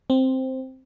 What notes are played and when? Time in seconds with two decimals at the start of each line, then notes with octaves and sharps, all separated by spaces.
0.10 C4